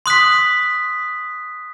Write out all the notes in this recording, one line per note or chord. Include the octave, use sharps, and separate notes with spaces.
C6 D#6 F#6 B6